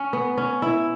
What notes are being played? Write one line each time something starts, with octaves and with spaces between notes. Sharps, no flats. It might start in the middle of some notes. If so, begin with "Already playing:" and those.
Already playing: C#4
B3
C#4
E4